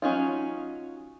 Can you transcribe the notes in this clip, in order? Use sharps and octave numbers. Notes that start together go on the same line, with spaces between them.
F#3 C#4 D#4 F4